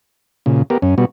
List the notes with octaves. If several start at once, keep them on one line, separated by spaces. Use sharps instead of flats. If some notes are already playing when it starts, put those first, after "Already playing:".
A#2 C#3
B3 G4 A#4
F#2 C#4
B2 G3 B3 F#4